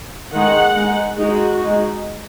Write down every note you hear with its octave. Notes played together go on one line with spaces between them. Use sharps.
D#3 G#3 D#4 F#5
G#3 D#4
G#3 D#4 F#4
G#3 D#4